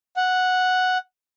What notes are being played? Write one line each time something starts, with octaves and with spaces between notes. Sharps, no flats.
F#5